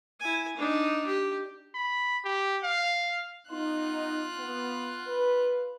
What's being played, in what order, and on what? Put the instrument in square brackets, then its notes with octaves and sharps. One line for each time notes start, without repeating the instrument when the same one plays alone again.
[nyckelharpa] E4 G#5
D4 D#4
G4
[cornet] B5
G4
F5
[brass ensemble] B3 D#4 [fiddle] F4 F#6
[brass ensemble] B3
B4